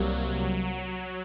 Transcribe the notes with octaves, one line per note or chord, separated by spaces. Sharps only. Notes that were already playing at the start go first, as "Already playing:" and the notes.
Already playing: C2 C3 F#3 G3 A#3